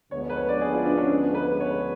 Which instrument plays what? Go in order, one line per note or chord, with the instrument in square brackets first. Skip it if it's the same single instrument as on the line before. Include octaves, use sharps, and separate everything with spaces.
[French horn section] D2 D3 F3 G#3 B3 [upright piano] C#5
[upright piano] B4
C#5
D5
G#4
F4
D4
C#4
B4
C#5